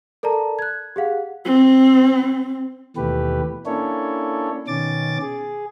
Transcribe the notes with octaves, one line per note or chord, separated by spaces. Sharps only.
A4 A#4 D5 A5 A#5
F#6 G#6
G4 G#4 F5 F#5
C4
D#2 B2 E3 A3 G4 B4
A#3 C#4 D4 E4 A4 C#5
B2 D#3 C#4 D6 A6
G#4